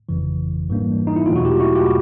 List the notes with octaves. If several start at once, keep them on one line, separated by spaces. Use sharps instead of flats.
G1 F2 C#3 E3
G#2 E3 G3 A#3 D4
D#4
E4
E2 B2 F#3 A3 F4
F#4
F4 G4
E4 F#4
F4 G4